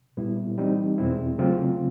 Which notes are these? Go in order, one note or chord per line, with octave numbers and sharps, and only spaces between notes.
A#2 G3 B3 E4
E3 G3 C4 D#4
E2 B2 G#3 C4 E4
C#3 F#3 A3 C4 F4